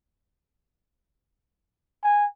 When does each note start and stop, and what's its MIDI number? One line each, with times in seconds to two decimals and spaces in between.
2.04 2.25 80